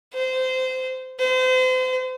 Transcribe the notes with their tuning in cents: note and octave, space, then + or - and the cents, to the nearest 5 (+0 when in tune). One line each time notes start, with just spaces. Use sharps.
C5 -20
C5 -35